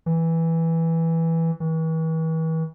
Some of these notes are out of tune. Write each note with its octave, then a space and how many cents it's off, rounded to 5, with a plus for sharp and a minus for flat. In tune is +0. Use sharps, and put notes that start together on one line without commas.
E3 -5
E3 -40